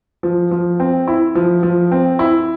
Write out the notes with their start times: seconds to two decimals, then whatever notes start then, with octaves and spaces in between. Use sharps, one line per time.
0.23 F3
0.51 F3
0.80 C4
1.08 E4
1.35 F3
1.63 F3
1.92 C4
2.19 E4